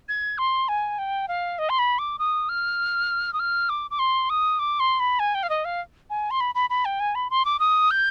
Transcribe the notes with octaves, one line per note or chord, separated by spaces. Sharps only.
G#6
C6
G#5
G5
F5
D#5
C6
B5
D6
D#6
F6
D#6
F6
D6
D6
C6
D#6
D6
C6
B5
G#5
G5
F5
D#5
F5
G#5
C6
B5
B5
B5
G5
G#5
B5
C6
D6
D#6
G6